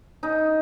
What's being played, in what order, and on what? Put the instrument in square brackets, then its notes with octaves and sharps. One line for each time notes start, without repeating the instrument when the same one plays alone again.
[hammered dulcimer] D#4